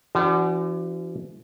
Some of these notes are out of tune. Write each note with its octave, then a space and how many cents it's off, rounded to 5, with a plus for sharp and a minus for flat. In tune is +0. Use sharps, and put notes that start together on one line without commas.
E3 +45 D4 -5 F#4 +25